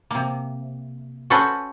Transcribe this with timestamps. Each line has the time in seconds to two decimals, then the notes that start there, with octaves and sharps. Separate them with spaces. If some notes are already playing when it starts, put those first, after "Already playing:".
0.11 C3 A#3
1.30 C#4 F#4 A4 B4 C5